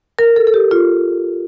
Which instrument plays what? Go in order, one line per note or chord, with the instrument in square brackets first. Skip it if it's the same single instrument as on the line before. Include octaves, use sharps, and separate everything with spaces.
[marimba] A#4
A4
A4
G4
F4